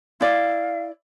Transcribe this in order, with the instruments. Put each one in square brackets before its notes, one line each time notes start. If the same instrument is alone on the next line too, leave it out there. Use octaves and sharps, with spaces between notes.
[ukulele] E4 D5 [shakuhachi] F5